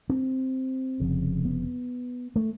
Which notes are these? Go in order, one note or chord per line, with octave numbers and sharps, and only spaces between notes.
C4
F1 F2 C#3
B3
A3